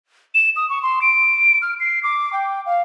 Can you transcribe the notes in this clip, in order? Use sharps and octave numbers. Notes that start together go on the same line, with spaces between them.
E7
D#6
C#6
C6
D7
F6
C7
D6
G5
F5